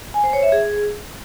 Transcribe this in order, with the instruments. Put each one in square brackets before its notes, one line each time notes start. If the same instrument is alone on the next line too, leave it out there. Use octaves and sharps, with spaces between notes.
[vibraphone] G#5
C5
C#5
E5
G#4